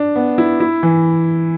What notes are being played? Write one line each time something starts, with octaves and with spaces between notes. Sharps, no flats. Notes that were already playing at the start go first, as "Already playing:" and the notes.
Already playing: D4
B3
E4
E4
E3